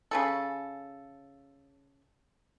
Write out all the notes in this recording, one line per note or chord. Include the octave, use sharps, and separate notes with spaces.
C#3 G3 A4